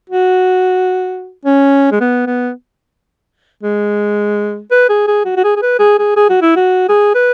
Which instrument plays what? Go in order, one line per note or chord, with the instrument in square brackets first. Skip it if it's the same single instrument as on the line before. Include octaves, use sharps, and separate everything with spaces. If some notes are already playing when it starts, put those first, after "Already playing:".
[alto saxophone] F#4
C#4
G#3
B3
B3
G#3
B4
G#4
G#4
F#4
F#4
G#4
G#4
B4
G#4
G#4
G#4
F#4
E4
F#4
G#4
B4